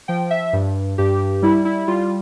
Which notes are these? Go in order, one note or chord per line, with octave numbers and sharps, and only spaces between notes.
F3 G5
E5
G2
G2 G4
G3 E4
E4
G3 F4